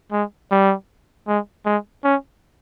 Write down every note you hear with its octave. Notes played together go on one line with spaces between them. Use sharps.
G#3
G3
G#3
G#3
C#4